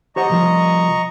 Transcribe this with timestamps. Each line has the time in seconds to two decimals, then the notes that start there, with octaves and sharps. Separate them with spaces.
0.16 G4 C5 D#5 F#5 A#5 C#6
0.30 C2 F3 F4